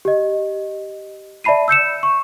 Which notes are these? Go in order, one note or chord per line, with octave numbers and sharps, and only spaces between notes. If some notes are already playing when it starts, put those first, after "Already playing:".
G4 D#5
D5 E5 A5 B5 C7 D#7
E6 G6 C#7 E7
C#6